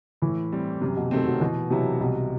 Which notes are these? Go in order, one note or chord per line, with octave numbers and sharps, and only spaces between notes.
A2 E3
G3 C4
F#2 C3
B2
C3 D#3 A3 C4
F#3
B2 E3
C3 F#3 B3 E4
C2 B2